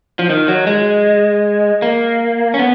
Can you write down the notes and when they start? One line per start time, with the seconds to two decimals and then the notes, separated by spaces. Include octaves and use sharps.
0.19 F3
0.30 D#3
0.48 F#3
0.67 G#3
1.82 A#3
2.54 C#4
2.59 B3